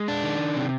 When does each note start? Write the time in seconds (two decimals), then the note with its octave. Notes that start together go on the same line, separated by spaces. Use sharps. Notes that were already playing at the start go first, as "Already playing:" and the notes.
Already playing: G#3
0.08 D4
0.23 D#3
0.56 C3